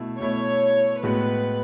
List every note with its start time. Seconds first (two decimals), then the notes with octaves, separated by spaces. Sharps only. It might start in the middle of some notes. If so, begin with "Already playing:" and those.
Already playing: B2 A3 E4
0.20 B2 A3 E4 C#5
1.03 A2 G#3 B3 F#4 B4